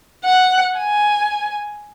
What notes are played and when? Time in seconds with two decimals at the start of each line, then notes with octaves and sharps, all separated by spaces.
0.25 F#5
0.76 G#5